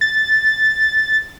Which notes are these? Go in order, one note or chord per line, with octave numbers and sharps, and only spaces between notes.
A6